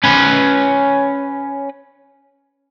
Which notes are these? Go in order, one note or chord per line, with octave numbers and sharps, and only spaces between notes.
C#4 B4